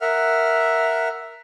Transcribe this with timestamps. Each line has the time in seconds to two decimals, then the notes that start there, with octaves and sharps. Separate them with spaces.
0.01 A#4 E5 F#5 F6